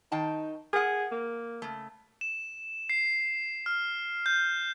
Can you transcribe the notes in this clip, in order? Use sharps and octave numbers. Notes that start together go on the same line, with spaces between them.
D#3 D#4 G5 A5
G#4 A#4 F#5
A#3
C#3 A3
E7
C7
F6
G6